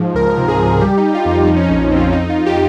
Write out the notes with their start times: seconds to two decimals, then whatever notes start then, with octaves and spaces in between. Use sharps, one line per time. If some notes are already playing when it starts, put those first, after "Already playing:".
Already playing: G#2 F3
0.15 C#2 A#4
0.38 C3
0.48 G#4
0.60 C#2
0.81 G3 G4
0.97 D#4
1.03 G3
1.15 F4
1.25 F2 D#4
1.47 F3 D#4
1.56 C#4
1.63 D#4
1.69 A#1
1.79 D#4
1.91 C4
1.97 F4
2.12 F2 D#4
2.30 F2 F4
2.46 G4